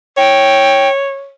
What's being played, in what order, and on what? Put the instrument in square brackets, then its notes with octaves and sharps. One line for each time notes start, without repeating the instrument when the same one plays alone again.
[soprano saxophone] C#5 [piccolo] G5